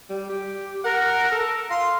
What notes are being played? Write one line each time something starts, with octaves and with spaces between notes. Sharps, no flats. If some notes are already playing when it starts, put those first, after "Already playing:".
G3
G4
A#4 F#5
A4
F5 C6